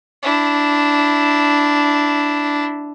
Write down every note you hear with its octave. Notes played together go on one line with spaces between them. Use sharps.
D4 E4